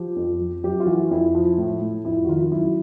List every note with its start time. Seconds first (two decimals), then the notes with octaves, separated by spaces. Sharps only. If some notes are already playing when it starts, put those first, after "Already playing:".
Already playing: F3 G4
0.16 F2
0.40 F3
0.64 F#2 G4
0.80 F4
0.86 E3 F#4
1.11 F2 E4
1.35 F3
1.58 A2
1.82 A2
2.05 F2 E4
2.24 F#4
2.29 D#3 F4
2.52 F#2 E4